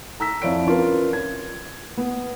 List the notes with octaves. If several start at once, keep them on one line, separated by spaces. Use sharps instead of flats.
A#5 E6 B6
F2 F3 E4 C#5 D5 D7
C#4 F4 A#4 B4
G#6
B3